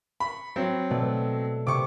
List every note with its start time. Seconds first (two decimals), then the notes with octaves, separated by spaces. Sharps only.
0.20 B5 C#6
0.56 F#3 C4
0.90 B2 A3 D5
1.67 C3 C#6 D6